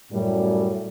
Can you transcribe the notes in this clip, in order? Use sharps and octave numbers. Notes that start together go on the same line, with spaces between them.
F#2 A2 G3